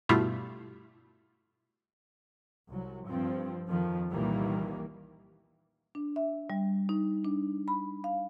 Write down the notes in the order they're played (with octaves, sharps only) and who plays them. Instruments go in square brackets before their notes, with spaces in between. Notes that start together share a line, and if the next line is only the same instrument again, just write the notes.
[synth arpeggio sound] G2 B2 G3 A3 E4 F4
[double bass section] C2 F#3
G2 F3 C4
F2 D#3 F3
C2 A#2 D#3 E3 G3 A#3
[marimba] D4
E5
G3
D#4
D4
B5
F5